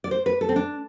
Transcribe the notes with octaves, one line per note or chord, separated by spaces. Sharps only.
D5
C5
B4
A4
C4
D4